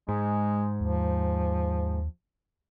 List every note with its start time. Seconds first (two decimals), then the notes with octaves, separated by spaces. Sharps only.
0.09 G#2 G#3
0.80 D#2 F3